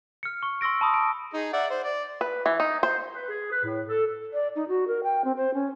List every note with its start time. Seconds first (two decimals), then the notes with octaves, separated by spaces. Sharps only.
0.23 F6 C#7
0.43 C#6
0.61 C6 C#6 E6 A#6 D7
0.81 A5 B5 D#6
0.94 D7
1.34 D#4 G#4
1.53 D5 E5 F#5
1.70 C5
1.84 D5
2.21 B4
2.46 E3
2.60 D#4
2.83 C5
3.12 B4
3.28 G#4
3.51 B4
3.63 A2
3.87 A4
4.33 D5
4.56 D#4
4.69 F#4
4.88 A#4
5.04 G5
5.25 C4
5.37 C5
5.54 C#4